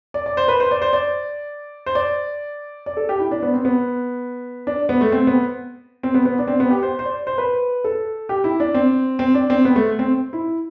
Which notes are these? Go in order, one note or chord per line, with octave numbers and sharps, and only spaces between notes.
D5
D5
C5
B4
C5
D5
C5
D5
C5
D5
D5
A4
G4
E4
D4
B3
C4
B3
D4
B3
A3
C4
B3
C4
B3
B3
D4
C4
B3
G4
C5
C5
D5
C5
B4
A4
G4
E4
D4
C4
C4
D4
C4
B3
A3
C4
E4